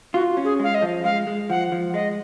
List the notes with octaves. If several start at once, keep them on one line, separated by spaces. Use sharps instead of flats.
F4 F#4
C#4
G#4
G#3 F5
D#5
F3
G#3 F5
G#3
F3 F#5
F3
G#3 D#5